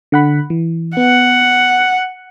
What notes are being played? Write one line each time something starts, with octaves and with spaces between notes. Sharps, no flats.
D3 F#5 B5
E3
B3 F#5